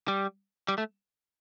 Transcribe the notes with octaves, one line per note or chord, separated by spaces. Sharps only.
G3
G3
A3